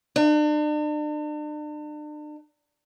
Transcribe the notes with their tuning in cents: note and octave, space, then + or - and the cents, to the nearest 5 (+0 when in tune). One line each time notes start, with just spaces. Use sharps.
D4 +40